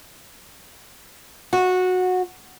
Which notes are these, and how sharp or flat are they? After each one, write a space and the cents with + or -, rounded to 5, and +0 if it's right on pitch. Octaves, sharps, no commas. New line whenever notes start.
F#4 -15